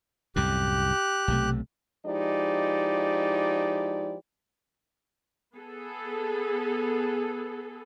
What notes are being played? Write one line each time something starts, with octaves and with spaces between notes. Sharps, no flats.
C2 F#2 A2 G4 F#6
B1 C3 A3
F3 G#3 D#4 E4 G4 D5
B3 G#4 A4